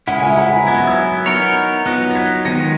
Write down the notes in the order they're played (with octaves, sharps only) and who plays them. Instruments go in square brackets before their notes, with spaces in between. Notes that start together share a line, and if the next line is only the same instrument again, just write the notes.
[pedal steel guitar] C#3 G#3 C#4 E4 [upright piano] F#5
[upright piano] E5 G#5
F#5 A#5
G#5 B5
[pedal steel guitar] F#3 B3 E4 [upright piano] G#6
[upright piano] A#6
E6 G#6
[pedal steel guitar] B3 D#4 A#4 C#5
[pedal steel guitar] F#3 B3 D#4 [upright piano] F#6 A#6
[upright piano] A#6
G#6 B6
[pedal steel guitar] D#3 G#3 D#4 [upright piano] A#6 C#7